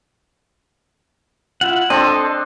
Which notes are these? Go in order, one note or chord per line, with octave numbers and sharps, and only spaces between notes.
E4 F4 F#5
C4 D4 A4 D#5 C6